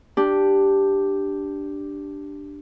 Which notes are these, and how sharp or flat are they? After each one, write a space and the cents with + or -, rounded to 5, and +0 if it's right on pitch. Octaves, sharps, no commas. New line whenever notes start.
D4 +0 G4 +0